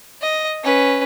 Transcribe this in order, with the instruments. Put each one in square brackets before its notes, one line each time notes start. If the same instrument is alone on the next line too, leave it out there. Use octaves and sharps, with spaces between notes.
[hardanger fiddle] D#5
C#4 B4